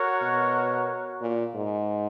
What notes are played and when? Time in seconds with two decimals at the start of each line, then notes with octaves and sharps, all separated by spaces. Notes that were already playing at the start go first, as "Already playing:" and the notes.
Already playing: F#4 A#4 C#5 F#5
0.22 B2
1.21 A#2
1.55 G#2